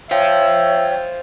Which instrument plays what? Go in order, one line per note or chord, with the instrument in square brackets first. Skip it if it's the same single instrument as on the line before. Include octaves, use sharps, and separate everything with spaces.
[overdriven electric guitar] C5 F5 [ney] C#5 [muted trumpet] E5 [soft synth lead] G5